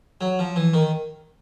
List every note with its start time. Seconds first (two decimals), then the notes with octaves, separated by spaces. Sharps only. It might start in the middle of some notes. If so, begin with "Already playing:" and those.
0.21 F#3
0.39 F3
0.56 E3
0.74 D#3